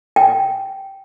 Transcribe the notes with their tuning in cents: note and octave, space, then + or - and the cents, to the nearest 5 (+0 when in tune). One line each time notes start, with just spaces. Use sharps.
G5 -10